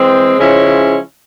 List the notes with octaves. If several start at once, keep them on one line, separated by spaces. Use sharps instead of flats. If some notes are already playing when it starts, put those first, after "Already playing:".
Already playing: E3 G#3 C4
C#3 F3 G#3 C#4 E4